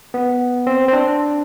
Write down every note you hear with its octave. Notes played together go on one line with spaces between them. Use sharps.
B3
C4
C4
D4